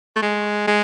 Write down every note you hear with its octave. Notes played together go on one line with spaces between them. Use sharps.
A3
G#3
G#3